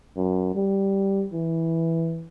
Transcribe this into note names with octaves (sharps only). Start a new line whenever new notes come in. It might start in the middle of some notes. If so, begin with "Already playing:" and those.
F#2
G3
E3